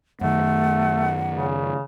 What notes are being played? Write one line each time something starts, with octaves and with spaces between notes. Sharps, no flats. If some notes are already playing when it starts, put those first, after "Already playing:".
F#2 D#3 A3 F#5
C#3